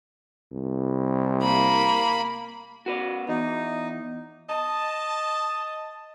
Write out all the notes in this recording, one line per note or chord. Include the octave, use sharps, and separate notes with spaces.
C2
A#3 B5
F#4 B4 D5
E2 D#4
D#5 A5